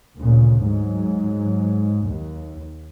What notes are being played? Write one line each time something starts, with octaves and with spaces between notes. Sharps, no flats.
D2 A#2 C#3
G#2 F#3
D#2